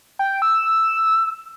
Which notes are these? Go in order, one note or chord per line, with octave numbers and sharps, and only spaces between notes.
G5
E6